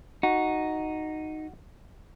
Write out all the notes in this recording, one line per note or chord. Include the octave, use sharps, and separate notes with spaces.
D#4 F#4